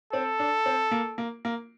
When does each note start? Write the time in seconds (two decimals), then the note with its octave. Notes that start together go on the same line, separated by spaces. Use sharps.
0.13 C4 A4
0.40 D4
0.66 C4
0.91 A#3
1.18 A#3
1.45 A#3